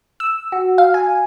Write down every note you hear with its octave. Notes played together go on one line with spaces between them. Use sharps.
E6
F#4
F5
G#5